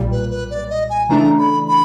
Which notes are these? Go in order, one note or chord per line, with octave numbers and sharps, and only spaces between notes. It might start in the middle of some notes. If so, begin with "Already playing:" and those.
Already playing: B1 A#2 G3
B4
B4
D5
D#5
G#5
C#3 E3 A3 D4 A#5
B5
B5